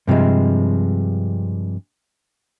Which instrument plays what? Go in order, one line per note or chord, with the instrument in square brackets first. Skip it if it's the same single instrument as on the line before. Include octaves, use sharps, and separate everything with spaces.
[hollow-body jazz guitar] G2 C3 F3 G#3